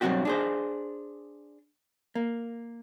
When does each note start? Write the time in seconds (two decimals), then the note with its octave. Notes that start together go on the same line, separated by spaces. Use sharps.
0.01 B1 G2 F#3 C4 F#4 G4
0.25 D4 G#4 C5
2.15 A#3